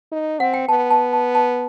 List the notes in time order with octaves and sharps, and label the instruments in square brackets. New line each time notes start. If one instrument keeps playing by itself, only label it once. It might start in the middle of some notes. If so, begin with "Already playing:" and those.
[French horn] D#4
[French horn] C4 [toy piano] F#5
[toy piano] G5
[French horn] B3 [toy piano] A5
[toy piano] A5
A5
A5